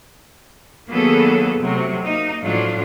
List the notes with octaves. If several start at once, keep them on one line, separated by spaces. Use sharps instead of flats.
D#3 F#3 A#3 B3 G#4 A4
C3 F#3 A3
A#3 D#4
A2 F3 F#3 D4 F4